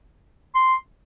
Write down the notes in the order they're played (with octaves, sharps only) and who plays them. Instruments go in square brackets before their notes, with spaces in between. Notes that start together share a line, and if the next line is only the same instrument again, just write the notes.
[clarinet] C6